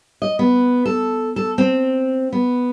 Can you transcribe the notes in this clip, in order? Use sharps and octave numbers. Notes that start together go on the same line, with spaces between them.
D#5
B3
A4
A4
C4
B3